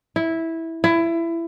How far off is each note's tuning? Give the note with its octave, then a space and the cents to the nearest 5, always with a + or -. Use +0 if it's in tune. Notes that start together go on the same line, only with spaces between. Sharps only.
E4 -10
E4 +20